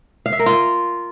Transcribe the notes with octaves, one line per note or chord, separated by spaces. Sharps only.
F5
E5
A#4
F4